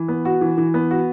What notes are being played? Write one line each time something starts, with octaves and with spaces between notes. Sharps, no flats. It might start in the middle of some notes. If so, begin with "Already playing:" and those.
Already playing: E3
B3
F#4
E3
E3
B3
F#4